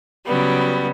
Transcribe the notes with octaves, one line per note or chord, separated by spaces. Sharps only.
C#3 F#3 G3 B3